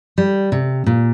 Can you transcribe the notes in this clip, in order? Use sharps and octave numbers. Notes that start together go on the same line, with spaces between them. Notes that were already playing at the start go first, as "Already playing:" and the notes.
G3
C3
A#2